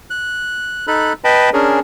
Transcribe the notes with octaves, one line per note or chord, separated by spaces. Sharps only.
F#6
D#4 A4 B5 F#6
B4 D#5 G5 A5 B5
C#4 D4 G#4 A#4